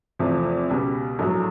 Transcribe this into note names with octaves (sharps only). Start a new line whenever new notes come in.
E2 C3 F3 A3
C#2 B2 G3
A#1 A2 F#3